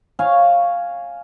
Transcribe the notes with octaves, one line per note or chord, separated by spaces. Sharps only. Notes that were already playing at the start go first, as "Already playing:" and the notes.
C#5 F5 G#5